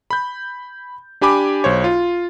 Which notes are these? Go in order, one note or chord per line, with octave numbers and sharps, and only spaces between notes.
B5 G6
D4 G4 G#5 B5 D6
B1 C5 C#5
F4